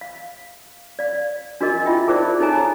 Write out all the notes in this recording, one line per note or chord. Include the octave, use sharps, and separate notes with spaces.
F5
D5 F5
D4 F#4 G#4 A#4 D#5
E4 F4 E5 G5
D#4 G#4 A#4 C5 D5
D#4 A4 C#5 G#5 A#5